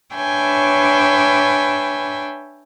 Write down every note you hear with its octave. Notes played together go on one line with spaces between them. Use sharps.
D4 B4 C#5 E5 G5 G#5